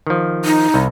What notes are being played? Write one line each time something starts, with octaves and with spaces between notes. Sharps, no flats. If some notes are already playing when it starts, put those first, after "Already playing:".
D#3 F3
D#4
C2